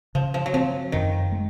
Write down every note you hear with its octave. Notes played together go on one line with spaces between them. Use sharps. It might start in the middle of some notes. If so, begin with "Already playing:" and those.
C#3 F3
F3
F#3
F3 C4
F#2 D#3
G#3